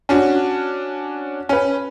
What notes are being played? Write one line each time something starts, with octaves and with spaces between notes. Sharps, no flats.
C#4 D4 F#4
C#4 B4